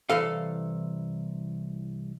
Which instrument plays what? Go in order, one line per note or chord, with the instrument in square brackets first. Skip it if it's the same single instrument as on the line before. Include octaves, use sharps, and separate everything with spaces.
[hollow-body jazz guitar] C2 G2 E3 A4 F5